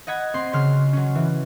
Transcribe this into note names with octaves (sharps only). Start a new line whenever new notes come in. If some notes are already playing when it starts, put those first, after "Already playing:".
D#5 F#5 B5 G#6
C4 C6
C#3 F#3 C6 F6
F#3 C#4
E3